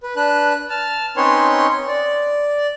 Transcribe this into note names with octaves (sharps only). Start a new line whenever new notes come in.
B4
D4 B4 F#6
A5 F6
C4 C#4 D#4 B4 C#5 C6
D5